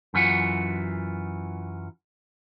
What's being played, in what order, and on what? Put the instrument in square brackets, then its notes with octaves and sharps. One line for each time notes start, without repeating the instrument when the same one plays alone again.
[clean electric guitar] F#2 E3 F4 F#4